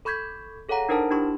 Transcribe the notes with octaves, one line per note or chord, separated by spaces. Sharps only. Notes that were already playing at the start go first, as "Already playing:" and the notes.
A4 B5 C#6 G6 G#6 B6
G#4 A4 C#5 F5 F#5 A#5
D4 D#4 A#4 C5 F#5 A5
D4 E4 G4 B5 C#6